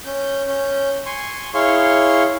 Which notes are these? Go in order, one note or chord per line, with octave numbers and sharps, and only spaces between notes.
C#4 G6
C#4 G6
G#5 C6 C#6
E4 G#4 C#5 F5 C6 C#6